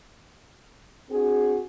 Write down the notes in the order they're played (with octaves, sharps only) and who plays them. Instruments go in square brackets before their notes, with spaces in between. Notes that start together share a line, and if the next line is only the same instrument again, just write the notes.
[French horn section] C4 D4 F#4 G#4